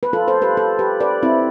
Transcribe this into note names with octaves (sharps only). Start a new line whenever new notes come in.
B4
F4 A4
A4 C5
G4 B4
F4 A4
G4 B4
B4 D5
C4 E4